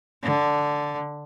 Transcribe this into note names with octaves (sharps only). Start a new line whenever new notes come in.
D3